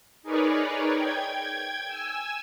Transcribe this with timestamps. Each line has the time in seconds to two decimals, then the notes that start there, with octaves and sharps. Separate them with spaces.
0.23 D#4 G#4 A#4 B4 C#5 D5
0.93 G5 G#6
1.87 G#5 E6